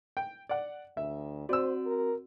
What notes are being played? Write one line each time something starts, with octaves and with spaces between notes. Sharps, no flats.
G5
D5 F#5
D2 E5
C4 F#4 C5 D5 E6
A#4